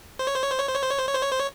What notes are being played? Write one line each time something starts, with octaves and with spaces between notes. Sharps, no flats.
C5
C#5
C5
C#5
C5
C#5
C5
C#5
C5
C#5
C5
C#5
C5
C#5
C5
C#5